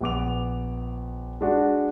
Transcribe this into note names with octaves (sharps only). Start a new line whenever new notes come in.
A#1 B3 D6 F7
G#3 D4 F#4